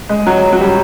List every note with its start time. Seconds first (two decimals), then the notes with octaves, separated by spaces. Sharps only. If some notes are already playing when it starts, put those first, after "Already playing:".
0.09 G#3
0.27 F#3
0.53 F#3
0.61 G3